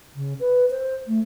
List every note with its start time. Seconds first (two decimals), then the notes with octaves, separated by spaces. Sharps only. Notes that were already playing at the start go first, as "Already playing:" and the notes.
0.15 C#3
0.40 B4
0.70 C5
1.07 A3